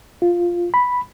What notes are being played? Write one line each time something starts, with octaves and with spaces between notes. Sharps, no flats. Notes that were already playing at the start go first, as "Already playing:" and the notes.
F4
B5